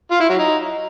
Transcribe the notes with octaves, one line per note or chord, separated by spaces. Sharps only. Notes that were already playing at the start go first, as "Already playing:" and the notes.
F4
E4
F#3
D#4